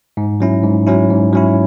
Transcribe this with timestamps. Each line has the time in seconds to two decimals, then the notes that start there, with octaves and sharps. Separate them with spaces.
0.17 G#2
0.40 F#3 C#4 E4
0.64 G#2
0.86 F#3 C#4 E4
1.10 G#2
1.33 F#3 C#4 E4